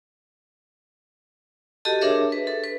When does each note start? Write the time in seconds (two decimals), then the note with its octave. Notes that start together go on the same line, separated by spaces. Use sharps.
1.85 F#4 G4 A4 D#5 A5
2.01 D4 G#4 A#4 C#5 E5
2.32 B4
2.47 A4
2.64 B4